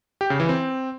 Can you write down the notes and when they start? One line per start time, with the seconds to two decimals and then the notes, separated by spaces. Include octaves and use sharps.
0.21 G4
0.30 C#3
0.40 E3
0.49 C4